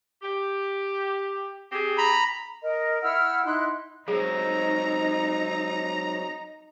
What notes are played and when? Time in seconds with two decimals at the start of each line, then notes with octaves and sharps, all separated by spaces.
0.22 G4
1.72 C4 G4 G#4
1.98 A#5 B5
2.61 A#4 D#5
3.03 E4 F#5 E6 F6
3.45 D#4 E4 C6 F#6
4.08 F#3 G#3 C4 D#4 G#4 A#5